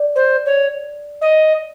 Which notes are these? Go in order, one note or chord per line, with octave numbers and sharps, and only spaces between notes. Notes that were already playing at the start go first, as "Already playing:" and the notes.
Already playing: D5
C5
C#5
D#5